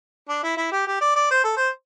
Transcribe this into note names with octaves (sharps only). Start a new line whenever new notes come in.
D4
E4
E4
G4
G4
D5
D5
C5
A4
C5